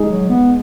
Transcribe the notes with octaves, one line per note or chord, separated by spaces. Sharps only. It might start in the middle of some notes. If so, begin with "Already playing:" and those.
Already playing: G#3 D#4 G#4
F#3
B3